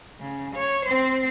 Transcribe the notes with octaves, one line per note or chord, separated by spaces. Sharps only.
C#3
C#5
C4 C5